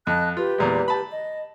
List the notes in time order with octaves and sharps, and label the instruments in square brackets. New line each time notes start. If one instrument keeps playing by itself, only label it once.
[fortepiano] F2 [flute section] D#5 A5 F#6
[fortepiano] F4 [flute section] G4 B4
[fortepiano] E2 A#2 G#3
A5 B5
[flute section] D#5